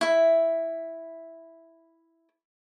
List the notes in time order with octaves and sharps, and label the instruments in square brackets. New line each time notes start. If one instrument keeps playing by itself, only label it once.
[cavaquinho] E4 E5